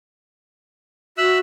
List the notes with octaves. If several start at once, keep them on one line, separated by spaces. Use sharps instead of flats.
F#4 E5 E6 F#6